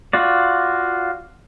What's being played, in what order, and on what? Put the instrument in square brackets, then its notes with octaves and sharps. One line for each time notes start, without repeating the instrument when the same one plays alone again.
[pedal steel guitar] F4 F#4 D5